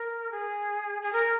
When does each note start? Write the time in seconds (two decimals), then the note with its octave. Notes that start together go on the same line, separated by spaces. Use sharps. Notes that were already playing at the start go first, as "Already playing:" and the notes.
Already playing: A#4
0.31 G#4
1.02 G#4
1.12 A#4